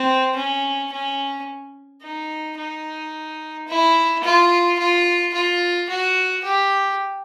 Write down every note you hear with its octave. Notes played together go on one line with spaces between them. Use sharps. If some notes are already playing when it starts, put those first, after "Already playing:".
Already playing: C4
C#4
C#4
D#4
D#4
E4
F4
F4
F4
F#4
G4